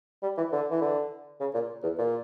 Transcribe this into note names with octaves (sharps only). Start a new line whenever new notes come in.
G3
E3
D3
E3
D3
C#3
A#2
E2
A#2